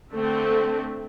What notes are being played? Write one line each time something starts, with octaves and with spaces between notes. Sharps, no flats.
D3 A3 C4